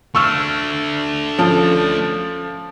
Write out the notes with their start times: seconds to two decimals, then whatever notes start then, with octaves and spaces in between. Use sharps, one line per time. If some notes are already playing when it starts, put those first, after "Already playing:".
0.15 A3 D4 C#6 E6 F6
1.39 F3 C#4 A4